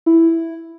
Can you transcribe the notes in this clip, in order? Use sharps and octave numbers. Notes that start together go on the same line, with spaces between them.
E4